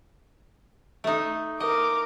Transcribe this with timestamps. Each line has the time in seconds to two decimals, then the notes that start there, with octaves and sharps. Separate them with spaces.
1.04 A3 D#4
1.60 A#4 D#5 D6